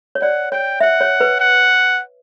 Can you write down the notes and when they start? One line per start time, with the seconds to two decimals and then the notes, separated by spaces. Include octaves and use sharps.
0.15 C#5
0.22 D5 F#5
0.52 C#5 G5
0.80 E5 F#5
1.01 C#5
1.20 B4
1.40 F#5